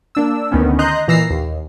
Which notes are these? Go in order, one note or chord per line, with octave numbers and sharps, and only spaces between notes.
A#3 D4 E6
D2 D#3 B3 C#4
D#5 A#5 C6 F#6 G6
A#2 E3 A#5 E6 C7
D#2